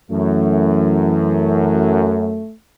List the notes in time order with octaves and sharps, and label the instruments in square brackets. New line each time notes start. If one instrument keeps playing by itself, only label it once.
[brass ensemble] F#2 [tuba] E3 [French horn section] A3